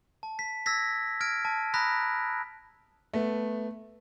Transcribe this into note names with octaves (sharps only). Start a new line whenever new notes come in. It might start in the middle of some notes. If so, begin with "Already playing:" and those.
A5
B6
E6 G#6 A#6 B6
F6 G#6 A#6 D7
A5
A#5 B5 D#6 F#6 A#6 B6
A3 B3